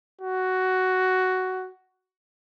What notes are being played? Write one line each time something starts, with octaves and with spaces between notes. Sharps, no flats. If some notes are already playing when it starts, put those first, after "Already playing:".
F#4